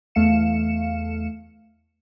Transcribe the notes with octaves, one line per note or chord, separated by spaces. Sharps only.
E2 A3 F5 C#7 E7